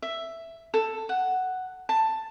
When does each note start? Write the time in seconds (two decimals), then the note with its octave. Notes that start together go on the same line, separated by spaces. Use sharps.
0.02 E5
0.74 A4
1.09 F#5
1.89 A5